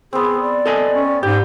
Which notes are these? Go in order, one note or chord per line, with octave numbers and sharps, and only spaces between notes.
B3 C4 G#4
D5
A4 D#5 G#5
C#4
G#2 G4 G5